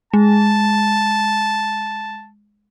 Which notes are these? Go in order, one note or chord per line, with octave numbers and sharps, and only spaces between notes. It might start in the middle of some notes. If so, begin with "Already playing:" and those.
G#3 A5